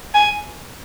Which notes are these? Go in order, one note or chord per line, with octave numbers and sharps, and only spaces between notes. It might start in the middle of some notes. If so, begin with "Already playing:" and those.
G#5